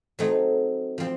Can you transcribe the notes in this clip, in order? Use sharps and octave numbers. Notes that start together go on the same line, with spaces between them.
F#3 A3 C4 D#4
F3 C4 F4